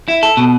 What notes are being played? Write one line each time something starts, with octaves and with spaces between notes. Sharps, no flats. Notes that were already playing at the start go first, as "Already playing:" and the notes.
E4
A4
B2